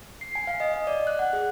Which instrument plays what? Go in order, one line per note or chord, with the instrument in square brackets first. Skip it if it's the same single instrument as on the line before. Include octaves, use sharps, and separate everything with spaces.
[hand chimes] C7
G#5
F5
D#5
D#5
D5
F#6
F#5
G#4